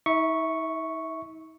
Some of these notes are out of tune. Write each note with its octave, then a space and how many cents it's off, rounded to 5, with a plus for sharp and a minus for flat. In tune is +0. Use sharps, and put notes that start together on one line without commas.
D#4 +45 E5 -15 C#6 +0